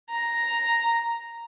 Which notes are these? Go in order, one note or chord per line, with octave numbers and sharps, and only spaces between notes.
A#5